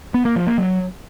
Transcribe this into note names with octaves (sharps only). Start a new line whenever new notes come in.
B3
A#3
F3
A#3
F#3